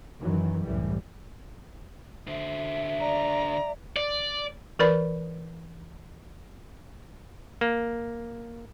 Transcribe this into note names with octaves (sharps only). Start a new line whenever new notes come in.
F#2 D#3 E3 F#3
C2 F#2 A2 E3 G3
D3 C5 E5
D5 A#5
D5
E3 A#4 B4 D5 B5
A#3